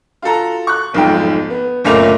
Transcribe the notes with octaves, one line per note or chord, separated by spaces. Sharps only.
F4 F#4 A4 A#5
C#6 F#6
F1 B1 G#2 F3 G5
B3
F#1 A#2 A3 A#3 C#4 F7